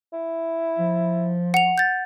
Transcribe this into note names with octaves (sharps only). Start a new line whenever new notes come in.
E4
F3
F#5 F7
G6 A6